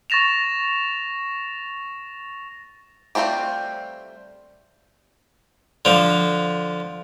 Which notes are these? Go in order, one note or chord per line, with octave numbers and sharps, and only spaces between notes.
C#6 A6 A#6 E7 F7
G3 A3 C4 F4 G4
D3 F3